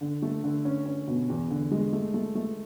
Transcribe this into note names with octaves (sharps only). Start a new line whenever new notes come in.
D3
A3
D3
C#4
C#4
B2
E2
D3
G#3
A3
A3
A3